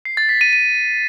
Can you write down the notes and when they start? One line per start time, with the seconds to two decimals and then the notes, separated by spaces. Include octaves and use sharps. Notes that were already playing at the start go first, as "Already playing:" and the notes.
0.05 C7
0.17 A6
0.29 B6
0.41 D#7
0.53 D#7